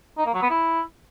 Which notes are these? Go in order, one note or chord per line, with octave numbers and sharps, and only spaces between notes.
D#4
A#3
F#3
B3
E4